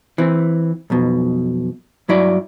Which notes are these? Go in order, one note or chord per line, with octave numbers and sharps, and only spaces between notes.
E3 C4
B1 F2 B2
G2 F#3 E4 D5